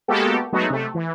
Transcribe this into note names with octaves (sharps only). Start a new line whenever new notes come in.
G#3 A#3 B3 F#4 G4 A4
F#3 G#3 A3 B3 D#4 F#4
C3 A3
E3